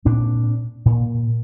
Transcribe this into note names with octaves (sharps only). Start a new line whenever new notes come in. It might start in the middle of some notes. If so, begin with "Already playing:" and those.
A#2 C4 D4
A#2